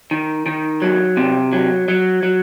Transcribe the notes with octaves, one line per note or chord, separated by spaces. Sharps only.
D#3
D#3
F#3
C3
F#3
F#3
F#3